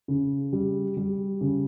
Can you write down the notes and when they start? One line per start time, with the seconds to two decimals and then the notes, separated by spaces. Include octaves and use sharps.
0.08 C#3
0.53 G3
0.97 G3
1.41 C#3